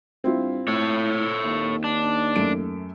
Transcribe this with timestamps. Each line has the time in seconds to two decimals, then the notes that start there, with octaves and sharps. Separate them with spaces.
0.24 G2 C4 E4 F4
0.68 A2 A4 C#5
1.45 D#2
1.84 D4
2.36 F#2 A3 D7